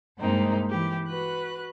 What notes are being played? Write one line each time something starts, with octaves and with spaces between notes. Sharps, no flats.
G2 C3 G#3 A#3 C4 D#4
E3 G4
F#4 B4 F#6